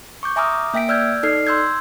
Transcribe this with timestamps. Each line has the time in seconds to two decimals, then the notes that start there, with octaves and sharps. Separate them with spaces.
0.23 C#6 D6 G6
0.36 E5 G#5 A#5 D6 D#6 F6
0.74 A#3 E5 G5 B6 D7
0.89 D5 E6 F6 G6 G#6
1.23 D#4 A4 D5 F6 C7
1.47 C6 E6 G6 G#6